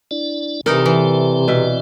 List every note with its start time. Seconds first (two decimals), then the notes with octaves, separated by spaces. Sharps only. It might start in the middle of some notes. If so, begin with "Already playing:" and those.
0.11 D4 E4 D5
0.66 C3 E3 C4 D#4 A4 A#4 D5
0.86 E3
1.48 B2 E5